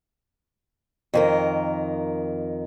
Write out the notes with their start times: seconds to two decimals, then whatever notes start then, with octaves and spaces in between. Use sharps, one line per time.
1.14 F2 D#3 A#4